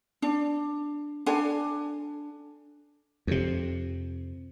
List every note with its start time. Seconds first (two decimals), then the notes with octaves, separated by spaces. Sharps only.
0.22 D4
1.26 D4 A4 G#5
3.27 F2 C3